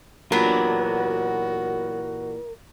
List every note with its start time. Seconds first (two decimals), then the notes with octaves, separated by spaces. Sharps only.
0.32 A#2 E3 F#3 B3 D4 F#4 G4 A#4